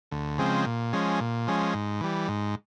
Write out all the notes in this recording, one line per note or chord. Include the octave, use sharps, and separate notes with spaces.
D2
C#3 F3 G#3 C4
A#2
F3 G#3 C#4
A#2
F3 G#3 C#4
G#2
E3 G3
G#2